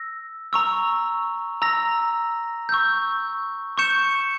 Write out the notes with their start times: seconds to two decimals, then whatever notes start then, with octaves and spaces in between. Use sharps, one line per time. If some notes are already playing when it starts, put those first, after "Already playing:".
Already playing: E6 A#6
0.53 A#5 C#6 E6
1.62 A#5 E6 A#6
2.69 C#6 E6 G6
3.78 C#6 G6 C#7 E7